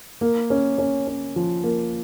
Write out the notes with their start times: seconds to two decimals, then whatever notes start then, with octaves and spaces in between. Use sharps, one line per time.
0.21 A#3
0.50 C#4
0.78 C#4
1.07 C#4
1.36 F3
1.64 A#3